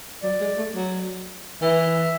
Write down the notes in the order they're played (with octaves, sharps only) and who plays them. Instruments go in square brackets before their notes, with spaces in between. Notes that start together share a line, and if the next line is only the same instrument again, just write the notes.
[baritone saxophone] F#3 [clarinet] D5
[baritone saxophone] G#3
A3
F#3
[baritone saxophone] E3 [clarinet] E5